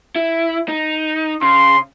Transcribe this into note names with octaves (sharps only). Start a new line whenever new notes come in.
E4
D#4
C#3 C6